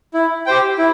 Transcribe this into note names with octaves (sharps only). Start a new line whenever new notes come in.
E4
G4 C5 G5
E4